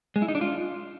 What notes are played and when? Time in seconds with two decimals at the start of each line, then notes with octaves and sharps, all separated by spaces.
0.16 G#3
0.22 E4
0.28 D#4
0.35 D4
0.41 F4